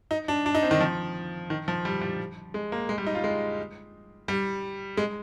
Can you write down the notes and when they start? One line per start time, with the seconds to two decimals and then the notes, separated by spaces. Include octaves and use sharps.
0.11 D#4
0.28 D4
0.46 D4
0.55 D#4
0.63 C4
0.71 D#3
0.81 F3
1.50 D#3
1.68 F3
1.85 G3
2.01 G3
2.54 G#3
2.72 A#3
2.89 G#3
2.98 G3
3.07 D#4
3.15 F4
3.24 G#3
4.28 G3
4.97 G#3